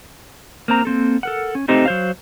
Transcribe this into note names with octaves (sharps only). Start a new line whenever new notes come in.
A#3 C4 A#5
A#3 C4 A4
A4 A#4 F#5
C#4
A3 C4 D#4 G4 C5
F#3 C5 F5